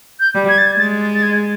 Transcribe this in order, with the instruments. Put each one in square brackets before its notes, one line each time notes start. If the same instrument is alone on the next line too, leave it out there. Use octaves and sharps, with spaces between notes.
[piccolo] G6
[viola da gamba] G3
[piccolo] G#6
A6
G#6
[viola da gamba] G#3 [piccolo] A6
[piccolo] A6
G#6